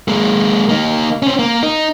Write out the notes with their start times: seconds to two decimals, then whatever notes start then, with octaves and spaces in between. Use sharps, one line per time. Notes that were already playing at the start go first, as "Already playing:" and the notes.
0.08 G#3 A#3
0.69 A#3 D#4
1.23 C4 C#4
1.39 A#3
1.63 D#4